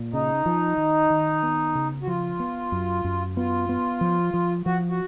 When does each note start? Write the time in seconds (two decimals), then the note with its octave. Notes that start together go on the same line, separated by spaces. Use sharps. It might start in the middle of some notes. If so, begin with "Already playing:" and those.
Already playing: A#2
0.13 C#3 D#4
0.46 F3
0.78 D#3
1.10 D#3
1.43 B3
1.75 C#3
2.03 F#4
2.07 F3 F4
2.40 B3
2.72 F#2
3.04 F#2
3.36 B3 F4
3.69 B3
4.01 F3
4.34 F3
4.66 F3 F#4
4.89 F#4